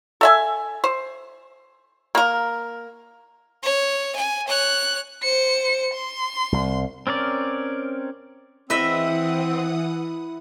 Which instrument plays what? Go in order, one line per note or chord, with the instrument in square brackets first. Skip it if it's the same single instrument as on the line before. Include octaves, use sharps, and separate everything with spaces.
[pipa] A4 E5 G#5
C5
A#3 A#4
[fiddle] C#5
G#5
C#5 F#6
[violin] C5 C#7
C6
[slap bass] C2
[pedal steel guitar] C4 C#4 A#4 D5
[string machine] E3 F#5 D#6 [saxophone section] C4 [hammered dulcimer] E4 [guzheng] B4 D#5 E5